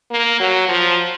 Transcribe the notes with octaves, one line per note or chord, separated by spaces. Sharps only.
A#3
F#3
F3